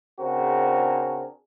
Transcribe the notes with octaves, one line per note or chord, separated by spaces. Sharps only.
C#3 C4 D4 F#4 G#4 A#4